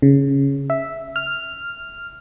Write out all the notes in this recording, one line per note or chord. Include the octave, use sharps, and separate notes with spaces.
C#3
E5
F6